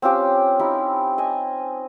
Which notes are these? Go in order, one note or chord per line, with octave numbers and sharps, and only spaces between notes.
C4 C#4 F4 G4
D#4 E4 G4
D#5 G#5